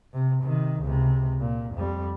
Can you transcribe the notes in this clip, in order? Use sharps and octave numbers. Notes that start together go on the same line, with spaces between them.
C3
C3 D#3
C#2 C3
A#2
F2 G3